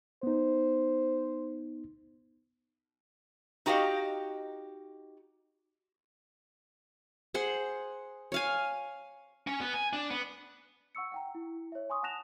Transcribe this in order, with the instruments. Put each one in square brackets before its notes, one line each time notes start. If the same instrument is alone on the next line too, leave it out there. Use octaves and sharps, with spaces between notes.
[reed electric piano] B3 D#4 [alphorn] C5
[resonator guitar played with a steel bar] D#4 F#4 G4 D#5 F5
[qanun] G#4 C5 F#5
C#5 F5 G#5
[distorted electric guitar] C#4
B3
G#5
D4
B3
[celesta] F#5 C#6 E6 C#7
F#5 G5 A#5
E4
C#5 E5
G#5 C6 C#6 D#6
F#5 A5 F#6 A#6 E7 F7